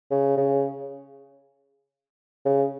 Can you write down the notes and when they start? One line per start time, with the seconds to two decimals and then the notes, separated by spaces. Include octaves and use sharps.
0.11 C#3
0.37 C#3
2.46 C#3